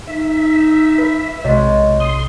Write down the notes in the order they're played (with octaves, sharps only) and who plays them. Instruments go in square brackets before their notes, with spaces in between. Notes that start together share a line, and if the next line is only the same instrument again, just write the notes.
[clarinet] D#4 [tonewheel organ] E5
[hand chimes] B4
[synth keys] B1 C3 [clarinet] G#3 [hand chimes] C#5 D#5
[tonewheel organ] C6 [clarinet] D#6